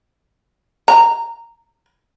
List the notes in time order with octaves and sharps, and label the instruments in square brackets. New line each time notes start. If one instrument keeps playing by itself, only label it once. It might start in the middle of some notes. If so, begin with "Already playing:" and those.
[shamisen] A#5